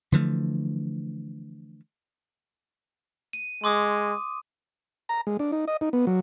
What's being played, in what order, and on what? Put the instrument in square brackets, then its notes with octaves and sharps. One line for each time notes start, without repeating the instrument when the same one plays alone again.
[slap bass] D3 E3 F3 A3
[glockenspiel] D#7
[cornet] G#3 [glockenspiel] C6 D6 D#6
[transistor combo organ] A#5
G#3
D4
D#4
D#5
D#4
B3
F#3